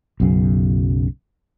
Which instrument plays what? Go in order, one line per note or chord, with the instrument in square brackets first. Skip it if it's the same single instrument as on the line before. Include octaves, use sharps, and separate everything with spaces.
[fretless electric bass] B1 F#2 C#3